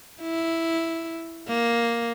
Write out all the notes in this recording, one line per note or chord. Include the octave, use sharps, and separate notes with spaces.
E4
A#3